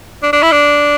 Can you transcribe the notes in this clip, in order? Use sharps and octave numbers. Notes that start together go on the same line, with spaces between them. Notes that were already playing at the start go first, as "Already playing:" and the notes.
D4
D4
E4
D4